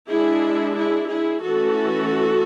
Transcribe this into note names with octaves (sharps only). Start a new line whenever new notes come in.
G#3 D4 E4 G#4
E4 G#4
E4 G#4
E3 A3 C#4 F#4 A4